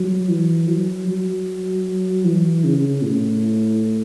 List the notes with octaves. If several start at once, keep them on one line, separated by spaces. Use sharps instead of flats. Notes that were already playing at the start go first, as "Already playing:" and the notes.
Already playing: F#3
E3
F#3
F#3
E3
C#3
A2